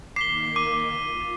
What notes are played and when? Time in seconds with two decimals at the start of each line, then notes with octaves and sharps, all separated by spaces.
0.16 D#3 A#3 D6 B6 C7 G7
0.56 D6 D#7
1.02 F4